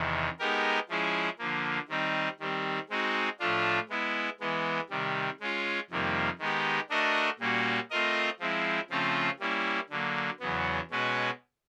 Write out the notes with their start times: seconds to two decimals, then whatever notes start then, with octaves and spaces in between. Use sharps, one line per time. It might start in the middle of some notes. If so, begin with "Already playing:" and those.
Already playing: E2 C3 D#3
0.39 G#3 B3 D#4 G4 A#4
0.89 F3 G#3 C#4 E4 G#4
1.39 D3 F3 A#3
1.89 D#3 G3 C4 D#4
2.40 D#3 G3 C4
2.89 G#3 C4 D#4 F#4
3.40 A2 F3 A3 D4 F4
3.89 G#3 B3 E4
4.40 E3 G#3 B3
4.90 C3 D#3 G3
5.40 G#3 C#4 F4
5.90 F2 C3 D#3 G3 A#3
6.39 D#3 G#3 B3 D#4 G4
6.90 A3 D4 F#4 A#4 D#5
7.39 A#2 G3 A#3 C#4 F#4
7.90 A3 C4 F4 A#4 D#5
8.40 F3 G#3 C4 E4
8.90 C#3 F3 A3 C4 F4
9.40 G3 A#3 C#4 E4
9.90 D3 F#3 A#3
10.39 E2 C#3 F#3 B3
10.90 B2 G#3 C#4 F#4 B4